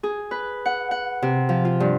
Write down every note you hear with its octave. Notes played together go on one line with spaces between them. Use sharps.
G#4
B4
F#5
F#5
C3
F3
F4
G2